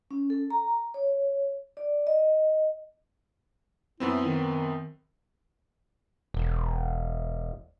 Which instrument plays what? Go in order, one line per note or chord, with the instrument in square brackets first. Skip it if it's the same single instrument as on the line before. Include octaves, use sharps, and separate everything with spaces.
[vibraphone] C#4
A4
A#5
C#5
D5
D#5
[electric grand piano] F#2 B3 C4 [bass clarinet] E4
[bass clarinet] D#3
[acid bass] E1